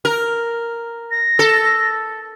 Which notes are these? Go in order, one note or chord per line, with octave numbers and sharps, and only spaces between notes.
A#4
A#6
A4